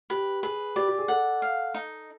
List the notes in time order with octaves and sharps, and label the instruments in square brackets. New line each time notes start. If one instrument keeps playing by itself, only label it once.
[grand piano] G4 [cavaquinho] B4
[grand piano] G#4 [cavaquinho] B4
[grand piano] G4 [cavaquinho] D5
[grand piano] G4
G#4
[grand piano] A4 [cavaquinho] F#5
[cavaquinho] F5
D#4